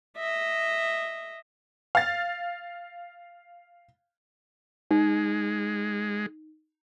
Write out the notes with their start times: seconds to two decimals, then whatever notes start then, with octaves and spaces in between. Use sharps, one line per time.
0.17 D#5 E5
1.95 F5 A6
4.91 G#3 D#4